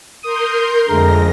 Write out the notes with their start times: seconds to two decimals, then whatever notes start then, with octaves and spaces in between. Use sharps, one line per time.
0.23 A#4 C6 D#6 G6
0.89 F2 D3 G#3 A3 A#4 A#6